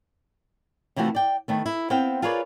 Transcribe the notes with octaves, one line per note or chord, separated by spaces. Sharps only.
C3 E3 F3 A3 F#4
D5 G5
D#3 A3 B3
E4
B3 C4 C5 F5 G5
F4 G#4 A#4 B4 C#5 D5